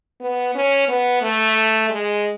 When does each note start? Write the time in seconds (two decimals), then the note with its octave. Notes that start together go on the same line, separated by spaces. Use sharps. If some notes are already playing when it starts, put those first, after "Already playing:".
0.21 B3
0.55 C#4
0.88 B3
1.22 A3
1.90 G#3